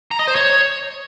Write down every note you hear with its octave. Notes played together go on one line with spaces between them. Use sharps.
A#5
D#5
C5
C#5